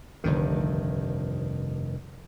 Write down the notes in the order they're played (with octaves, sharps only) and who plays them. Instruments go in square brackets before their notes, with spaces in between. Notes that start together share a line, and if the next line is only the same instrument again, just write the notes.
[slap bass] F1 G2 D#3 [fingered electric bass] C2 D3